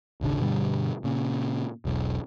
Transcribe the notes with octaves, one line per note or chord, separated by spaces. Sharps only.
D#1 G#1 C#3 D4
G2 B2 D3 G3
A#2 C#3
E1 B1